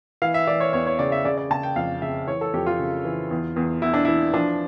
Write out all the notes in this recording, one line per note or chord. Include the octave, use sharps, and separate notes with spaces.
E3 F5
E5
E3 D5
C#5
E2 C#5
C#5
C#3 D5
E5
C#3 D5
D5
C#3 A5
G5
F2 F5
C#3 E5
E3 C#5
A4
F2 G4
F4
C#3
E3
E2
E2
E2 E4
D4
E3 E4
F3 D4